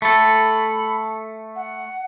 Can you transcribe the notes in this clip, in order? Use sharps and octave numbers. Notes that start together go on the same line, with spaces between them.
A3 A4 B5
F#5